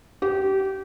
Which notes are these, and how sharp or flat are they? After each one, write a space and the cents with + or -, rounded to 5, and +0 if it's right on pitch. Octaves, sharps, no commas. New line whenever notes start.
G4 -25